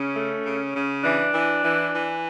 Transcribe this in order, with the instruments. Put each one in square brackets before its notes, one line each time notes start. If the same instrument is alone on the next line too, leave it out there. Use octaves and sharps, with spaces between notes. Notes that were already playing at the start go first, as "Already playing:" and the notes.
Already playing: [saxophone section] C#3 C#4
A3
C#3
C#3
E3 D4
E3
E3
E3